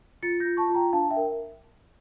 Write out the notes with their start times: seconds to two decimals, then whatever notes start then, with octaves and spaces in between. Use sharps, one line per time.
0.23 F4 A6 C#7
0.40 F4 G6 A#6
0.57 A5 C#6
0.69 F4
0.74 G5 A#5
0.93 D4 F5 A5
1.10 E5 G5
1.17 A#4